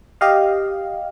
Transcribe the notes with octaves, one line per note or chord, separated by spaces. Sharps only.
G4 D#5 F5